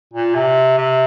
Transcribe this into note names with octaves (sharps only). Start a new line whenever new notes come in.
A#2
C3
C3